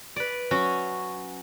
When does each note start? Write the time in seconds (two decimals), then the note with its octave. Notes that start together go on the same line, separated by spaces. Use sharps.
0.16 B4 D5
0.51 F#3 C#4 F#4